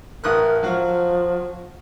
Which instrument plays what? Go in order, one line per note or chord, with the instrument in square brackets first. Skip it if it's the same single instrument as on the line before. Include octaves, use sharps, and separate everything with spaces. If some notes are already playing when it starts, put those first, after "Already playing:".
[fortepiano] A1 D#6 F#6 [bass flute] A#4
[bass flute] F3 [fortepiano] F#3 F#4 F5